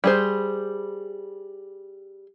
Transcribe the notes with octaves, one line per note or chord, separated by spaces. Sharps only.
G3 G#4 C5